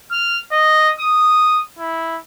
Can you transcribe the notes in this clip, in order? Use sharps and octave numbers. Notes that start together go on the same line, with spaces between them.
F6
D#5
D#6
E4